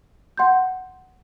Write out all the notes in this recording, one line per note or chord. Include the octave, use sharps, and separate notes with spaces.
F#5 C6 G6